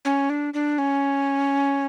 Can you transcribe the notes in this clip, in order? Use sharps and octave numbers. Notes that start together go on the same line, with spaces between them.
C#4
D4
D4
C#4